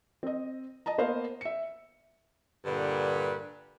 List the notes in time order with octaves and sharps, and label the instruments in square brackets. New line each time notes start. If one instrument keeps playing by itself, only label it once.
[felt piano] C4 D#5
D#5 A5 A#5
A#3 B3 C5 D#5 F5
E5 C#7
[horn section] G2 A#2 D3 B4